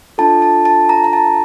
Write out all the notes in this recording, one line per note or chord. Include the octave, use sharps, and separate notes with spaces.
D4 F4 A4 A5
A5
A5
A#5
A#5
A5